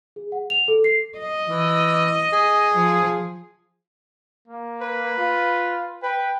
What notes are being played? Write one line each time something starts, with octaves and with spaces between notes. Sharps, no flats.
G#4
F#5
F7
A4
C7
D#5
E3
G#4
F3
A#3
B4
F4
B4 G5